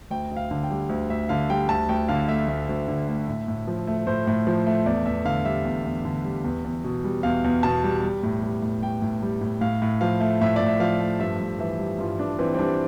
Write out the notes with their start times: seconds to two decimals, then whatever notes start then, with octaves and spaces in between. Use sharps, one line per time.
0.10 D2 G5
0.31 D2
0.36 F5
0.51 D3
0.63 G5
0.71 G3
0.89 D2
1.10 D2 E5
1.29 D3 F5
1.50 G3 G5
1.68 D2 A5
1.89 D2 G5
2.09 D3 F5
2.28 A3 E5
2.48 D2
2.69 D2
2.88 D3
3.08 A3
3.28 A2
3.48 A2
3.67 F3
3.87 A3
4.07 A2 C5
4.27 A2
4.47 F3
4.66 A3
4.86 E2 D5
5.06 E2 E5
5.25 D3 F5
5.45 G3 E5
5.65 E2
5.85 E2
6.05 D3
6.24 G3
6.44 E2
6.64 E2
6.84 B2
7.04 G3
7.23 E2 F5
7.44 E2
7.63 B2 A5
7.84 G3
8.03 G3
8.23 A2
8.42 G3
8.62 A2
8.82 G3 G5
9.02 A2
9.22 G3
9.41 A2
9.61 A2 F5
9.82 A2
10.01 F3 F5
10.20 A3
10.41 A2 E5
10.56 A2 D5
10.68 E5
10.80 F3 F5
11.00 A3
11.19 G2 E5
11.40 G2
11.59 E3 E5
11.79 G3
11.99 G2 F4
12.19 G2 D4
12.39 E3 C4
12.54 C4
12.59 G3 D4